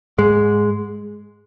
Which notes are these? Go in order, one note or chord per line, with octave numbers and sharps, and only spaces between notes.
G#2 G#3